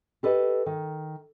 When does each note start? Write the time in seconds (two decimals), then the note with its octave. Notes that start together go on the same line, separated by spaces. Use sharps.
0.23 G4 A4 B4 D#5
0.66 D#3